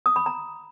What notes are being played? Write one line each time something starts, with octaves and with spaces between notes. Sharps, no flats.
D#6
B5
A#5